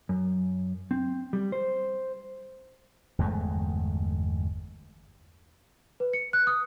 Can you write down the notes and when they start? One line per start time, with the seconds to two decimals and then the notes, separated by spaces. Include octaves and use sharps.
0.09 F#2
0.91 C4
1.33 G3
1.52 C5
3.19 G1 E2 G#3 A3
6.00 B4
6.13 C#7
6.33 F#6
6.47 D#6